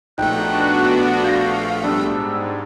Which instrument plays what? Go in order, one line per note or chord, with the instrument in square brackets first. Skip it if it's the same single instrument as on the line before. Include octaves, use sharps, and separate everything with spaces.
[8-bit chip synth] A#1 A3 [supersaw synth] B3 D4 F#4 [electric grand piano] D#4 G5 [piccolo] F#6
[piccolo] F5 [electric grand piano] G6 A#6
[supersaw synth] G#2 [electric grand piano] G3 B3 D4 [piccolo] E6